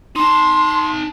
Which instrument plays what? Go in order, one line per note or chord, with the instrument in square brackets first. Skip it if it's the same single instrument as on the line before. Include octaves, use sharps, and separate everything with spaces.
[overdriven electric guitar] D#4 A5 [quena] C6